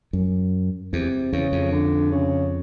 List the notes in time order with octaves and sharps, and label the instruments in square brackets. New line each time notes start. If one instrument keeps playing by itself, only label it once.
[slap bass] F#2
[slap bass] E2 [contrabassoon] C3
[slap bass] E2 [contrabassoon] C#3
[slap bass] F2
[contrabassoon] D3
C#3